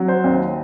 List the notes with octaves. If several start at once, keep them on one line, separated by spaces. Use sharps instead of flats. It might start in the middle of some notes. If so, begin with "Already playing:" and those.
Already playing: F#3
C5
D#2